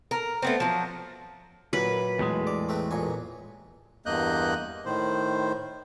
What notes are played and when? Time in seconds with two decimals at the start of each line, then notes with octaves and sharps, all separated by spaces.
0.11 A#4
0.42 A3 B3 C4
0.60 F3 F#3
1.73 F#2 A#2 B4
2.19 E2 A2 G#3
2.47 D5
2.69 A3 C4 B4
2.91 A1 A#2 G#5
4.06 E2 G2 A#3 D#5 F#6 G6
4.85 A2 D#3 C5